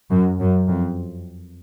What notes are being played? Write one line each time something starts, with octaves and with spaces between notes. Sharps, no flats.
F#2
F#2
F2